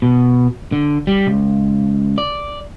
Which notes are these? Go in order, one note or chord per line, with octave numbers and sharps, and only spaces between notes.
B2
D3
G3
C#2
D5